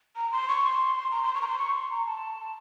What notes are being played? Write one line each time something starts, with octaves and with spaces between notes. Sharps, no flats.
A#5
C6
C#6
C6
A#5
C6
C#6
A#5
C6
C#6
C6
A#5
A5